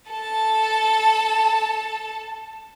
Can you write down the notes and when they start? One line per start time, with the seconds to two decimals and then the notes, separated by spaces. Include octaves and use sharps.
0.10 A4 A5